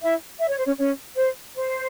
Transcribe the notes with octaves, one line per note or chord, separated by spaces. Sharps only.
E4 E5
E5
C#5
C5
C#4 C#5
C#4 C#5
C5
C5